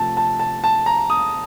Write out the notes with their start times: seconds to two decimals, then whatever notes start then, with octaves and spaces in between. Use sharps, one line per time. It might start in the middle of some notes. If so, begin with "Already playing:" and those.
Already playing: C3 F3 A3 A5
0.17 A5
0.40 A5
0.64 A5
0.86 A#5
1.10 D#6